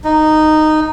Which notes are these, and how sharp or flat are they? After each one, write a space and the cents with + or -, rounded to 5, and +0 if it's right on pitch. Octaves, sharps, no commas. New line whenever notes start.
D#4 -10